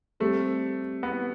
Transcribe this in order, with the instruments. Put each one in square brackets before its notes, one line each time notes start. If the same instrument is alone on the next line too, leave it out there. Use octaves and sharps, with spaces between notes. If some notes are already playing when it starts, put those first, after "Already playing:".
[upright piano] G3 C4 G4 [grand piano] A3
[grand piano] B3